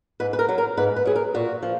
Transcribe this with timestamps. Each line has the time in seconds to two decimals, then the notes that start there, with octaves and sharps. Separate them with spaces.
0.20 G#2 B4
0.33 B4
0.39 A#4
0.49 F#3
0.58 A#4
0.77 G#2 B4
0.96 B4
1.05 F#3 G#4
1.15 A#4
1.35 A#2 F#4
1.62 F3